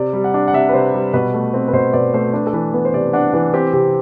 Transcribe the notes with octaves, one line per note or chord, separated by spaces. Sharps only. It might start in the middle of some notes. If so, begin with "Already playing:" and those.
Already playing: C3 D5
G3
F#5
D4
F#5
C3 E5
B4
C3 C5
G3
B2 B4
A3
C4
B4
B2 C5
B2 D5
A3 C5
D4 B4
A4
E3 B4
B3 B4
C5
C3 D5
D4 F#5
E3 F#5
C4 G4
C3 G4